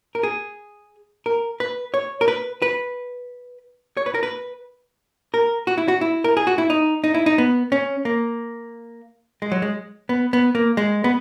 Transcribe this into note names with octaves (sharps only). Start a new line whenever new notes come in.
A#4
G#4
A#4
B4
C#5
A#4
B4
B4
C#5
B4
A#4
B4
A#4
F#4
E4
F#4
E4
A#4
G#4
F#4
E4
D#4
D#4
E4
D#4
B3
C#4
A#3
G#3
F#3
G#3
B3
B3
A#3
G#3
B3